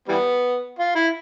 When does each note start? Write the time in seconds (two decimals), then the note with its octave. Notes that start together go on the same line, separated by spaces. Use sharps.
0.08 E3 G3 B3
0.79 F4
0.96 E4